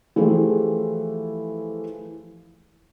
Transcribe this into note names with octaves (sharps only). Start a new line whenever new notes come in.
E3 F3 A3 G4 G#4